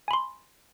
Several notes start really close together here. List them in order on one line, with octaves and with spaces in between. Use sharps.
G#5 B5 C6